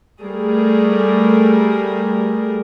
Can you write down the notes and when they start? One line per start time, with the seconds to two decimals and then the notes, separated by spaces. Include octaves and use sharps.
0.23 G3 A3 G#4 A#4